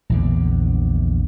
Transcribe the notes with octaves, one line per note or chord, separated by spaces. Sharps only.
A#1 E2 D3